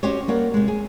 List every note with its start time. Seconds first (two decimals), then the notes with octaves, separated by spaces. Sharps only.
0.03 C#4 F#4 G4 C5 C#5
0.28 G3 A#3 C#5 F#5
0.54 C3 G#3
0.68 G#4